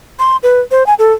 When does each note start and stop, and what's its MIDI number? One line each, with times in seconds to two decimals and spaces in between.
0.19 0.37 84
0.43 0.60 71
0.71 0.86 72
0.86 0.94 80
0.99 1.13 69